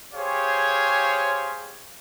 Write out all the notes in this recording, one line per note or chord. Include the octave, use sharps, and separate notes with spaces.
G4 G#4 C5 C#5 F5